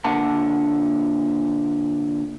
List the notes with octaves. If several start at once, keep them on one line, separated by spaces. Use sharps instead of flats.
A#2 D3 A#3 F#5 A5